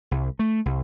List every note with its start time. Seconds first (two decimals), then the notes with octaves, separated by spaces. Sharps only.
0.11 C2
0.39 A3
0.66 C2